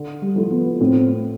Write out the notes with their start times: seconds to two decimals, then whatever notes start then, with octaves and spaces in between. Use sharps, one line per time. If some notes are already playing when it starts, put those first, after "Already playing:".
Already playing: D3
0.23 G3
0.36 F3 A3 E4
0.51 B3
0.80 A2 C4